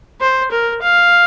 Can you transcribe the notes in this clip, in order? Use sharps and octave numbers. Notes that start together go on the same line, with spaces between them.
C5
A#4
F5